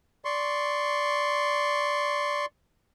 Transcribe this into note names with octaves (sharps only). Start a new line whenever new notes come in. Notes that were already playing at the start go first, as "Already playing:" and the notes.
D5 C6 C#6